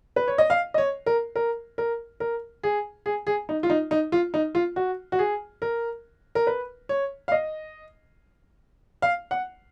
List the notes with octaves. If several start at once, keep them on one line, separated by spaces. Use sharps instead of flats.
B4
C#5
D#5
F5
D#5
C#5
A#4
A#4
A#4
A#4
G#4
G#4
G#4
D#4
F4
D#4
D#4
F4
D#4
F4
F#4
F#4
G#4
A#4
A#4
B4
C#5
F5
D#5
F5
F#5